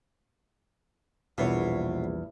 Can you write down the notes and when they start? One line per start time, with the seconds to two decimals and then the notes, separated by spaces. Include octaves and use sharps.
1.38 A#1 E2 B2 G3 C#5